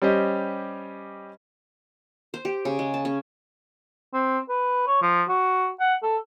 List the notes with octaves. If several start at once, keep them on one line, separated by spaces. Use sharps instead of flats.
G3 C#4 G4 C5 D#5
C5
G4
C#3
G#3
A5
C#4
C4
B4
C#5
F3
F#4
F#5
A4